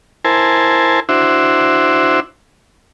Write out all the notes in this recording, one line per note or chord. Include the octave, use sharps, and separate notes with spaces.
E4 A#4 C5 G#5 A5
D4 E4 F#4 C5 E5